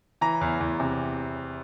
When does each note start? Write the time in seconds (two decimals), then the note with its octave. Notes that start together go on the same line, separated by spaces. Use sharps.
0.21 E3 A#5
0.41 E2
0.60 E2
0.80 C3